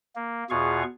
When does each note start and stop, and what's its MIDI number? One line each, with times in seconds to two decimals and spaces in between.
0.16 0.44 58
0.50 0.83 40
0.50 0.83 47
0.50 0.83 65
0.50 0.83 68
0.50 0.83 77
0.50 0.83 85